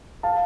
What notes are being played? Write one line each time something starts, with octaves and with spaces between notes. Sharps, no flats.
F5 A5